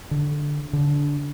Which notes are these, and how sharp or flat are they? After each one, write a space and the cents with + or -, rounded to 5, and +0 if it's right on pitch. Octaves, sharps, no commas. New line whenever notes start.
D3 +0
D3 -20